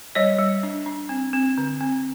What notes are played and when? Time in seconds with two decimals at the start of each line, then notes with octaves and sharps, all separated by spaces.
0.15 G3 C#5 D#5
0.39 G3
0.63 D4
0.86 D4
1.09 C4
1.33 C4
1.58 D3
1.81 C4